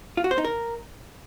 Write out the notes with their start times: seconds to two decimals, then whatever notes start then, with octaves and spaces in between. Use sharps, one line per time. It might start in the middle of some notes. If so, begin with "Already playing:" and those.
0.17 F4
0.24 F#4
0.31 C5
0.38 D#4
0.45 A#4